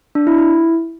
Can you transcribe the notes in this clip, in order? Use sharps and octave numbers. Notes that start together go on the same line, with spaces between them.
D4
E4
E4